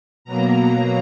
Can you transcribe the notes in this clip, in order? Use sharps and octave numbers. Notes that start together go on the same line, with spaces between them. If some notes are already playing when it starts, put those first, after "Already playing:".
B2 F#3 A#3 A#5